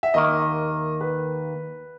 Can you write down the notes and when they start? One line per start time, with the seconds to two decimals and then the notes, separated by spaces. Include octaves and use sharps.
0.03 E5
0.14 D#2 D#3 A#3 D#5
1.01 B4